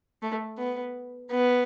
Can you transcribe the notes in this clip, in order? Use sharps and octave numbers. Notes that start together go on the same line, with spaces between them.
A3
B3
B3